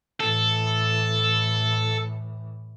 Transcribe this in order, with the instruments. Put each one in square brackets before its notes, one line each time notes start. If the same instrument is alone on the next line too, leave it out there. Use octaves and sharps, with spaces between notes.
[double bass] A2 E3 [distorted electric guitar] A4